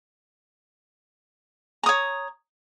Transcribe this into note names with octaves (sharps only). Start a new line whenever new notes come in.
C#5 A#5 D#6